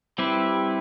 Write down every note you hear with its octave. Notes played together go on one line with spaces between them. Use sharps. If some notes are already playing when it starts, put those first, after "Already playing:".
G3 C4 E4 G4 B4